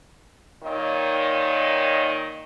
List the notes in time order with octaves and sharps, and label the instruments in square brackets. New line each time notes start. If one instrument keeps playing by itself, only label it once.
[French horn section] A#2 D#3 C#5 D#5